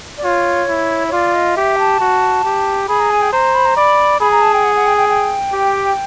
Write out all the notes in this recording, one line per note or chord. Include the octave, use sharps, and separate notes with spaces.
D5
F4 C#5
E4
C#5
F4 D5
D#5
G4 E5
A5
F#4
G4
G#4 B5
A#5
G#5
G5
C5 A#5
B5
A#5
D5 B5
G#4 B5
A#5
A5
G5
F#5
F#5
G5
G5
G5
G4